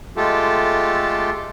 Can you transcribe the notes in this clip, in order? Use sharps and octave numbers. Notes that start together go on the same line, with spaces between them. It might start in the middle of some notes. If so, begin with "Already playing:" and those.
G#3 A3 F4 G4 A4